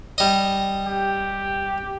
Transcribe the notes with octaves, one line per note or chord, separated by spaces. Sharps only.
G3 D#5
G4